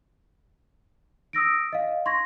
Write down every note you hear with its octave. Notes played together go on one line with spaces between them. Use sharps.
D#6 E6 A#6 D7
D#5 F5
C6 C#6 G#6 A#6